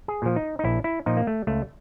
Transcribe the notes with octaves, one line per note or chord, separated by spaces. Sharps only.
G#4
A#2 F3
D#4
D#4
A#1 E4
E4
A#2 F3 D#4
A#3
A3
C#2 A3